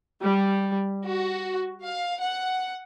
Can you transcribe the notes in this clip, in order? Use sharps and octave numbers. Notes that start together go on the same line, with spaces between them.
G3
F#4
F5
F#5